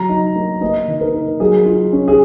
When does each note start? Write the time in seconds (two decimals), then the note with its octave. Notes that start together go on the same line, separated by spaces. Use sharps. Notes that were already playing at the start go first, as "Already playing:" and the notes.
Already playing: F#3 A#5
0.09 D#4
0.36 A#3
0.61 A#3 D#5
0.88 D#3
1.01 A#4
1.14 D#4
1.40 F#3 G#4
1.66 F4
1.93 C#4
2.08 G#4